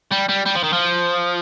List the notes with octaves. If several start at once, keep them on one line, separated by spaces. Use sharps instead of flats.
G3
G3
G3
F3
D#3
F3